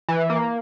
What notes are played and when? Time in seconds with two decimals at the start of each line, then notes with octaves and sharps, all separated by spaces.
0.09 E3
0.30 A#3